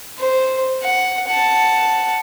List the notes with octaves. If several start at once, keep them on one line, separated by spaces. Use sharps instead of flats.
C5
F#5
F#5 A5